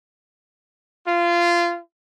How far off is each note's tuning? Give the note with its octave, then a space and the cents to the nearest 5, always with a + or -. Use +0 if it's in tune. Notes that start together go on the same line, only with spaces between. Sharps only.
F4 -20